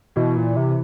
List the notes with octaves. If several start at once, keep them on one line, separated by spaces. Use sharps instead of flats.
B2 E3
A#2
C3